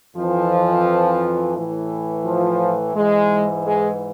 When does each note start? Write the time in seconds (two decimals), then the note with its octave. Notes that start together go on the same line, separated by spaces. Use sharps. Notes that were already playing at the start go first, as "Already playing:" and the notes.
0.15 F2 E3 F3
1.55 A2 E3
2.25 F3
2.95 G#2 E3 G#3
3.65 G#3